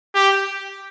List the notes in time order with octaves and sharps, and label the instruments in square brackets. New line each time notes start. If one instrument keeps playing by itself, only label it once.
[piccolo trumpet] G4